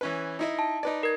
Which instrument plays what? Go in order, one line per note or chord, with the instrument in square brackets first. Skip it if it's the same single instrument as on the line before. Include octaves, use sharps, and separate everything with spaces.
[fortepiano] E3 C#4 B4
D#4 E4 D#5
[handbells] A5
[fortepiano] D#4 B4 D5
[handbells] A#4 G#6